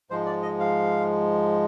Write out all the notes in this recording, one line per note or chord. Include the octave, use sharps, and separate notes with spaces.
G#2 F3 G#3 C5
D5
D#5
F5